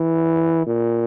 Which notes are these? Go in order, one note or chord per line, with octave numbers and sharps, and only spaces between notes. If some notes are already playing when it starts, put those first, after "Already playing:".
Already playing: E3
A#2